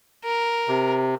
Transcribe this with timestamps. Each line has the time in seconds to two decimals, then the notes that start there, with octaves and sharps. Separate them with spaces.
0.24 A#4
0.68 C3